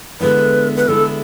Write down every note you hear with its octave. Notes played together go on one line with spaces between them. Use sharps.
D3 G#3 B3 E4 B4
B4
D3 G#3 B3 E4 A4